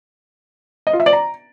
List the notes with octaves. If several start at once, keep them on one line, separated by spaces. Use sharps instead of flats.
D#5
F4
E5
D5
A#5